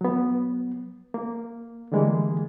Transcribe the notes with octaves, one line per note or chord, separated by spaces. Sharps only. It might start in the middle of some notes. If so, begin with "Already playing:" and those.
F#3 B3
A#3
D3 E3 G3 G#3 A#3